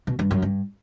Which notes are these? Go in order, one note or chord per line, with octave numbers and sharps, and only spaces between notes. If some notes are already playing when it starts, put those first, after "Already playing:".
B2
G2
F#2
G2